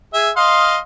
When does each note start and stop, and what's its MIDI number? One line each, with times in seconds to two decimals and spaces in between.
0.14 0.30 68
0.14 0.30 76
0.37 0.78 75
0.37 0.78 77
0.37 0.78 84